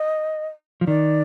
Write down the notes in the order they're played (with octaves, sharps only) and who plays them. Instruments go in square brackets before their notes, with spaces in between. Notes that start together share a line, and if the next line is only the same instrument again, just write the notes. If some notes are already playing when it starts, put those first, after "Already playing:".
Already playing: [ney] D#5
[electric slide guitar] F3
[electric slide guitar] D#3 [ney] D5